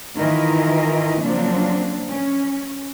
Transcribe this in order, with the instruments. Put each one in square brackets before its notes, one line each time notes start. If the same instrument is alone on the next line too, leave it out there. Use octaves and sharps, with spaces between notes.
[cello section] D#3 E3 E4 F4 A#4 D#5
C#3 F3 F#3 A#3 C4 D4
C#4